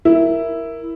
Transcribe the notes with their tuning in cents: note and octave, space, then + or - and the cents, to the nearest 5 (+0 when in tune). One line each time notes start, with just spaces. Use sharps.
E4 +0 A#4 +0